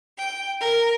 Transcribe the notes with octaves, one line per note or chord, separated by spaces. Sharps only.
G5
A#4